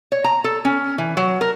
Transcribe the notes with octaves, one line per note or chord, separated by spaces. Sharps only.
C#5
A#5
A4
C#4
E3
F#3
A#4